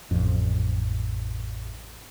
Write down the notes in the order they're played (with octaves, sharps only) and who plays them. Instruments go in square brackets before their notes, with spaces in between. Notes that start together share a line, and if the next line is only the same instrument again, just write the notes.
[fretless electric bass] A1 F2